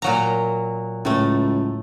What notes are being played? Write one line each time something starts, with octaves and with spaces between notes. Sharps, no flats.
A#2 F#3 A#5
C#2 A2 A3